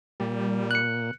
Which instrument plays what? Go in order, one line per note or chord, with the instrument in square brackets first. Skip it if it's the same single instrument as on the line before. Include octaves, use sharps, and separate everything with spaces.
[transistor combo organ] A#2 [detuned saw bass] G3
[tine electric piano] F#6 C#7